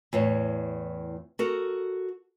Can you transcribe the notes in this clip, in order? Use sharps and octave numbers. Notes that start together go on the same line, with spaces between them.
E2 A2 C#5
F#4 A4 A#4